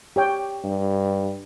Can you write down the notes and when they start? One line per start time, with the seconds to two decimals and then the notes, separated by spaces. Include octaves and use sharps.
0.16 G4 C#5 G5
0.64 G2